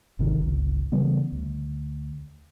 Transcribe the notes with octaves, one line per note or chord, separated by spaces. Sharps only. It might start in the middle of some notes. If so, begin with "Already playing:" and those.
G#1 C3 D#3
G1 C#2
C#3 E3 G3 B3
D2